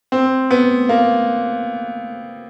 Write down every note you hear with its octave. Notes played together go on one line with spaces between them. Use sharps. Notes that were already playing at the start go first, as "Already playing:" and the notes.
C4
B3
A#3